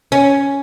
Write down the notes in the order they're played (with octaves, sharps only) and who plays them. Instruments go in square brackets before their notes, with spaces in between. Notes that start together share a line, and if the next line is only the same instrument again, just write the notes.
[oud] C#4